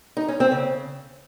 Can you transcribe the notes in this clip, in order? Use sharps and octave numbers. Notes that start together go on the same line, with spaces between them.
D#4
C#4
C4
C#3